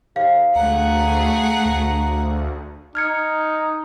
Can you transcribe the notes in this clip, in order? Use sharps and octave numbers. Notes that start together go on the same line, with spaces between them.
D#2 F5
D2 A3 G#4 F#5 A#5
D2
D#4 F6 G#6 C#7